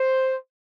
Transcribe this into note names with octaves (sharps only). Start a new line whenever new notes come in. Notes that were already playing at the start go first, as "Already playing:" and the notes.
Already playing: C5